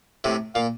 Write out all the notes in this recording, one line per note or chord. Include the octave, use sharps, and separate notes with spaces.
A2 C3
A#2 F5